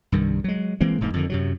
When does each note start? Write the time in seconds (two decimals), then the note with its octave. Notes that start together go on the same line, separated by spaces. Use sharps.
0.12 C2 G2 D#3
0.44 F#3 G#3
0.81 E3 G#3 A#3 C4
1.01 E1 G#2 G3 A#3
1.14 F2 D3 D#3
1.30 F#2 C3 F#3